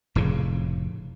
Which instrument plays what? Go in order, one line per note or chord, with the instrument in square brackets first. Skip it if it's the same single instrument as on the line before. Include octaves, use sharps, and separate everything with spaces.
[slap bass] F1 A2 C#3